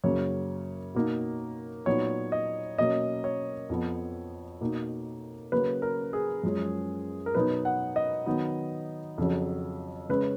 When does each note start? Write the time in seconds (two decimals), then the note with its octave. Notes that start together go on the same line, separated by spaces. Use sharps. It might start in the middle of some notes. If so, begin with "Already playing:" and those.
0.04 F#2 C#3 F#3 A#3 C#5
0.95 B2 A#3 D#4
1.86 A#2 F#3 B3 D#4 C#5
2.32 D#5
2.78 B2 F#3 A#3 C#4 D#5
3.24 C#5
3.70 F2 F3 B3
4.61 B2 A#3 D#4
5.52 C#3 F#3 A#3 C#4 B4
5.82 A#4
6.13 G#4
6.43 F#2 F3 G#3 C#4
7.26 A#4
7.35 B2 F#3 B3 D#4 B4
7.65 F#5
7.96 D#5
8.26 D#3 F#3 B3 D#4
9.18 F2 C#3 F#3
10.09 C#3 G#3 C#4 B4